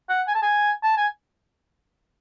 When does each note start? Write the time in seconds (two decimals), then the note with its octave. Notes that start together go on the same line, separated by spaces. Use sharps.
0.09 F#5
0.28 G#5
0.35 A5
0.42 G#5
0.83 A5
0.97 G#5